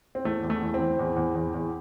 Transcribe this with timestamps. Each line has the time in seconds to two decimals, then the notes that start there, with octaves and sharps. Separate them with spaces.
0.15 C4
0.24 E2 A3
0.43 E2
0.50 A3
0.61 E2
0.74 C4
0.79 E3
0.99 E2
1.16 E2
1.35 E2
1.54 E2